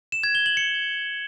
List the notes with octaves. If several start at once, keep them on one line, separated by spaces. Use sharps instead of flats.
E7
G#6
G7
F#7
C#7